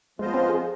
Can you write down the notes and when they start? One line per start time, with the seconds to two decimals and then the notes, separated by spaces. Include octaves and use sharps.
0.19 F3 G#3 B3 F4 C5 D#5
0.34 C4
0.49 G#4